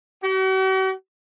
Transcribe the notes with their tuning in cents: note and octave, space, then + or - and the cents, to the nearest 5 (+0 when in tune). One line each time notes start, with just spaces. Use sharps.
F#4 +45